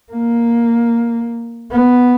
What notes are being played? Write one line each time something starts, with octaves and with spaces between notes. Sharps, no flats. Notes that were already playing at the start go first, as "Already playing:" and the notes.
A#3
B3